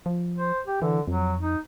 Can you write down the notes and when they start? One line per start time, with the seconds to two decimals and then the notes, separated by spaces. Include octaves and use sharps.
0.06 F3
0.36 C5
0.67 G4
0.82 D3 E3
1.07 F2 F#3
1.40 D#4